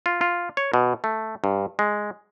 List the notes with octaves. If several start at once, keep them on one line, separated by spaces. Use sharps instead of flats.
F4
F4
C#5
B2
A3
G2
G#3